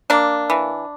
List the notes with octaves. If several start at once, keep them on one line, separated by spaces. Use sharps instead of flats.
A#3 D4
E3